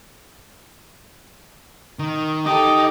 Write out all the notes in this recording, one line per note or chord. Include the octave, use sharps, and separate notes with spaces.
D#3
D#4 G4 A4 D#5 D6